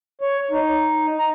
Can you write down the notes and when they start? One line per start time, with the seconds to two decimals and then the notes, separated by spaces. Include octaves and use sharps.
0.21 C#5
0.51 D#4
1.19 A#5